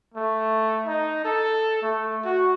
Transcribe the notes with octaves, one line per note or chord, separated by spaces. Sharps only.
A3
D#4
A4
A3
F#4